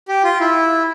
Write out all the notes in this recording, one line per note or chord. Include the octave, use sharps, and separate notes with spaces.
G4
F4
E4